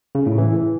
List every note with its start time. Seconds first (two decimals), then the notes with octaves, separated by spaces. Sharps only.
0.15 C#3
0.26 A2
0.38 E3